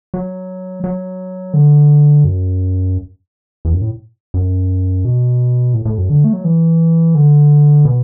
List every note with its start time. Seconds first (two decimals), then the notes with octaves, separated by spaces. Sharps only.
0.14 F#3
0.84 F#3
1.54 D3
2.24 F#2
3.65 E2
3.73 F#2
3.82 A2
4.34 F#2
5.05 B2
5.74 A2
5.86 A2
5.98 F#2
6.09 D3
6.24 A3
6.33 F#3
6.44 E3
7.15 D3
7.85 B2